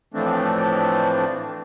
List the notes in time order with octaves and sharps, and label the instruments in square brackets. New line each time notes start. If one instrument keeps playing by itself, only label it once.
[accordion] A2 E3 F3 A3 C4 D4